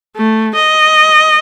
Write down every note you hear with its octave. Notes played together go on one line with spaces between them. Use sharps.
A3
D#5